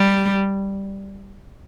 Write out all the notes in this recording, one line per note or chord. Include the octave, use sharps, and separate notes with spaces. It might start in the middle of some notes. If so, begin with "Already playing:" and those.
Already playing: G3